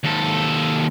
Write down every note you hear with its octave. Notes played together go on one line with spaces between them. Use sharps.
D#2 A4